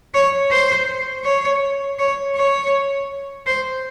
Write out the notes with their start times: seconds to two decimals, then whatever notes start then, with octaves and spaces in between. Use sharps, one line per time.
0.14 C#5
0.51 C5
1.24 C#5
1.99 C#5
2.36 C#5
3.46 C5